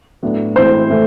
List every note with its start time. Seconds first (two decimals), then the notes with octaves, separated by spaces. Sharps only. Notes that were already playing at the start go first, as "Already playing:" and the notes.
0.23 A2 F#3 B3 D4
0.55 A2 E3 G#3 C4 E4 C5
0.89 A2 E3 A3